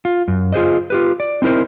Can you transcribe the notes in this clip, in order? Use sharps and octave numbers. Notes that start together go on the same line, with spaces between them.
F4
F#2
F4 G#4 C5 D#5
F4 G4 B4
D5
C4 D#4 E4 A#4 C5